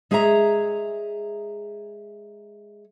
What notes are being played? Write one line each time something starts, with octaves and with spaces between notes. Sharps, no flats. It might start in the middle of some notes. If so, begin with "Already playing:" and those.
G#3 G#4 C#5 E5 G5 A#5